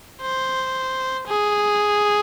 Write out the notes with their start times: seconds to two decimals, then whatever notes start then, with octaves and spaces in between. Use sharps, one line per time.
0.22 C5
1.27 G#4